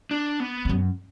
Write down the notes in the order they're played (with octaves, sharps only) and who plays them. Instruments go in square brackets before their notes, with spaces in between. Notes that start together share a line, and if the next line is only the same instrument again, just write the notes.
[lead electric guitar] D4
B3
[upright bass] E2
F#2